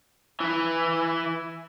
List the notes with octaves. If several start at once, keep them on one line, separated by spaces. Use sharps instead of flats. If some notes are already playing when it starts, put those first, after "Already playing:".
E3 E4